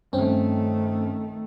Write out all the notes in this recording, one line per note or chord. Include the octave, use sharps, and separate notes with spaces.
G2 D#3 A3 C4 C#4